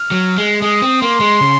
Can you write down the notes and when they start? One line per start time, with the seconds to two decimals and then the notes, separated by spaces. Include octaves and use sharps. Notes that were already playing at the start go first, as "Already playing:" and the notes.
Already playing: F6
0.11 F#3
0.37 G#3
0.62 G#3 D#6
0.82 C4
1.02 A#3 C6
1.20 G#3
1.41 C#3